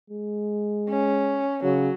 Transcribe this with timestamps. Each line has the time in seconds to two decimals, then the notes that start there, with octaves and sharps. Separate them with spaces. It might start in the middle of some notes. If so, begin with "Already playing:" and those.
0.10 G#3
0.89 C#4
1.64 C#3 F#3